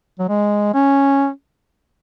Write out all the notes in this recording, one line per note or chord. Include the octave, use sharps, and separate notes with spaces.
F#3
G#3
C#4